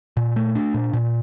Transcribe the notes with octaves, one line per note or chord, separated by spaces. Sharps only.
A#2
A3
D4
A#2
A#2